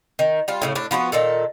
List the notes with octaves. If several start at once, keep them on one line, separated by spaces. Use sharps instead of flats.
D#3
G3 F4
A2 C#3 A3
A2 D4
F3 B3 D4 F#4
A#2 D#3 A4